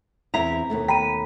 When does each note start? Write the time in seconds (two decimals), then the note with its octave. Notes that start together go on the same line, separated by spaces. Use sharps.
0.34 E2 C4 E4 A#5 B6
0.70 D#2 B2 A3
0.88 G5 A#5 B5 B6 D#7